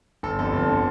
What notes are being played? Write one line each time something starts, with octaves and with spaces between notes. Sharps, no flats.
G1 A4
F2 D3 A4
G1
D3